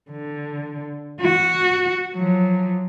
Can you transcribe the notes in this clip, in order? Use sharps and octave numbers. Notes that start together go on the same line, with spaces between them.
D3
F#4
F3 F#3